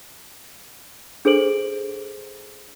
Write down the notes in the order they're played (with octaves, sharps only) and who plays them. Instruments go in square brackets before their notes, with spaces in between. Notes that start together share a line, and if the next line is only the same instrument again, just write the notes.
[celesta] D4 G#4 A4 C5 D7 F#7